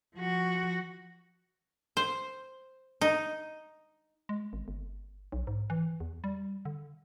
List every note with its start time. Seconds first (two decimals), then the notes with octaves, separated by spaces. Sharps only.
0.15 F3 F#4
1.97 C5
3.01 D#4
4.29 G#3
4.53 G#1
4.68 G1
5.32 B1
5.47 G#2
5.70 E3
6.00 E2
6.24 G3
6.65 D3